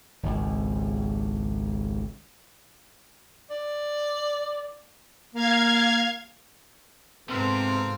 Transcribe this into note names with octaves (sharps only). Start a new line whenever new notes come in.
G#1 C#2
D5
A#3 F5 G#6
G#2 C3 B3 C4 F4 A4 A#4